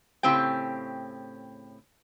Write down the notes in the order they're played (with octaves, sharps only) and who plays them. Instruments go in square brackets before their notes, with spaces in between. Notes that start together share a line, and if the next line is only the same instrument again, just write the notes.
[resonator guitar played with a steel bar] A2 C#3 C4 G4 G5